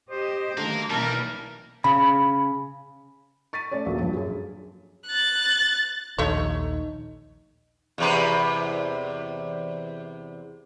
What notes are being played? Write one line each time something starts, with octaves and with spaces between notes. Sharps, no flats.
G4 C5 D#5
D3 D#3 F#3 A3 A#3
B1 E3 G3 A#3 A#4 A5
C#3 B5
C#6 A6 B6 D#7
A3 C#4 C#5 D5
D#1 A#1 F#3 A#3 A4
G2 F3 F#3
F#2 G#4
F#6 A6
A#1 D#2 A3 D#4 C#5
E2 C3 B4